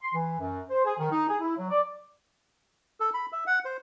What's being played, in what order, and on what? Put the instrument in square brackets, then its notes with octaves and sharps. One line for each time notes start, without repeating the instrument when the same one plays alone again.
[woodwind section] C6
E3
F#2
C5
G#4
D#3
D#4
G#4
E4
F#3
D5
[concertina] A4
B5
E5
F#5
C5